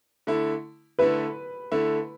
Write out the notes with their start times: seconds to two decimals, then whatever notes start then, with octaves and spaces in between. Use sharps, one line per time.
0.27 D3 A3 E4
0.99 D3 A3 E4 B4
1.72 D3 A3 E4